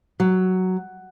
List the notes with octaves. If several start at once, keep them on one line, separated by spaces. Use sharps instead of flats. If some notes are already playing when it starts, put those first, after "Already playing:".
F#3